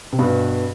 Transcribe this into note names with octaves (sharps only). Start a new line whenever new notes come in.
C3
G2 B2